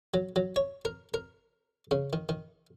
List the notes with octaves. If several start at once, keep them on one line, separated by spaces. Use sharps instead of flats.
F#3
F#3
C#5
A#4
A#4
C#3
D#3
D#3